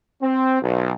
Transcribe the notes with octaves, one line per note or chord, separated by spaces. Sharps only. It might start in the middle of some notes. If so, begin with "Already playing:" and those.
C4
B1